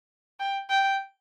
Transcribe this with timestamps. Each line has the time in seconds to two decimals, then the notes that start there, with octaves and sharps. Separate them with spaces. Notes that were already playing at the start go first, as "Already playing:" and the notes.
0.40 G5
0.70 G5